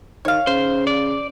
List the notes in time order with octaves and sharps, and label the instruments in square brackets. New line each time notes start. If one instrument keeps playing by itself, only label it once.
[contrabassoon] D#3 [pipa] C#5 F5
[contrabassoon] C#3 [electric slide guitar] C5
[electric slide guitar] D5